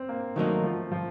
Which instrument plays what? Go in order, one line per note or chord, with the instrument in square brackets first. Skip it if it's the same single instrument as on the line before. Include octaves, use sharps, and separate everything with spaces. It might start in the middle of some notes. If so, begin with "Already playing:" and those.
Already playing: [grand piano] C4
A#3
[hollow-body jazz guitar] D#3 F#3 A#3 D#4 [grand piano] A3
[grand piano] F3
F3